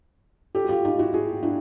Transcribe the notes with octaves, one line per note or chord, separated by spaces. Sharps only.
G4 A4
F#4
F4 G4
D#4 F4
E4 F#4
F#4 G#4
D4 E4